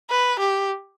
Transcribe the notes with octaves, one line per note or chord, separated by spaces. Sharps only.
B4
G4